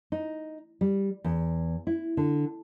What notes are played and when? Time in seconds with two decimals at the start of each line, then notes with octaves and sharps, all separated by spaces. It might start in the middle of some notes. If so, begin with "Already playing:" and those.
0.12 D#4
0.81 G3
1.24 E2
1.87 E4
2.17 D3